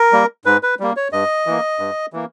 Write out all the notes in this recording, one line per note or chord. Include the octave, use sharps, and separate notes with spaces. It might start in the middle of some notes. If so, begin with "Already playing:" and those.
Already playing: A#4
G3 A#3
G#2 B4
B4
G3 A#3
C#5
G2 D#5
E3 A#3
G2
E3 A#3